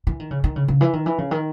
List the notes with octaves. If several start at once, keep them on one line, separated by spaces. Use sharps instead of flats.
E3
D#3
C#3
D#3
C#3
C#3
E3
D#3
E3
C#3
D#3